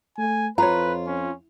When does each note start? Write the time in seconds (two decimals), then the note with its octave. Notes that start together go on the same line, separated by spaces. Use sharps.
0.18 A3 G#5
0.58 F2 F4 B4 C#5 A#5
1.07 C#4